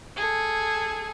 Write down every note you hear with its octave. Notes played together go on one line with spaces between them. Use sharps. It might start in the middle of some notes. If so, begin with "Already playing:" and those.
G#4 A4